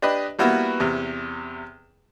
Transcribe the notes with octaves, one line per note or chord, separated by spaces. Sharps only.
D4 G4 B4 D#5 B5
G3 A#3 B3 E4 F#4 B4
E2 C3